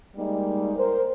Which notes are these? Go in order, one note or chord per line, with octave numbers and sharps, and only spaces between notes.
G3 G#3 A#3 D#4
A#4 C5